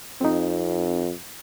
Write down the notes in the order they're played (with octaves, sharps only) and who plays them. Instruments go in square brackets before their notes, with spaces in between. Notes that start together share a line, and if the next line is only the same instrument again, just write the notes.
[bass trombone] F2 [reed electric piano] C4 D#4